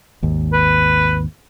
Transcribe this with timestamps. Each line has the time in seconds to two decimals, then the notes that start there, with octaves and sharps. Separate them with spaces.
0.23 G#1 D#2
0.53 B4